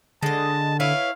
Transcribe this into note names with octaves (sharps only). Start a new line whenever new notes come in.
D3 G#3 D#5 A5
E4 B4 C#5 F5